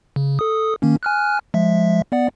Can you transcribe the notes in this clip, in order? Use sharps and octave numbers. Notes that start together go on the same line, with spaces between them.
C#3
A4 D#6
D#3 A#3 C#4
G#5 F6 F#6
F3 G#3 E5
B3 D5 F#5